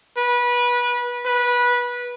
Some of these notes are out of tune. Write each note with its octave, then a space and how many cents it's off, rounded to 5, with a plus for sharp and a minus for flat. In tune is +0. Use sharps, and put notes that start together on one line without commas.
B4 -25
B4 -20